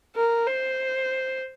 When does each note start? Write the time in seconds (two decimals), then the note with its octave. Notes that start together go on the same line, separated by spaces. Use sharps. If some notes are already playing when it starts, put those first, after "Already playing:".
0.16 A#4
0.46 C5